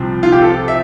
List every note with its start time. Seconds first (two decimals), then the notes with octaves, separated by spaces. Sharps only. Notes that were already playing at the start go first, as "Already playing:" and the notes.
Already playing: C2 C3 F3 C4
0.23 F4
0.32 G4
0.42 A4
0.68 E5